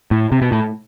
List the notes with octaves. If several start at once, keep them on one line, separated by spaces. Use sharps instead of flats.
A2
C3
B2
A2